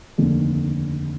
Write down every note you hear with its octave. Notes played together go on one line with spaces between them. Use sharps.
F1 D#2 D3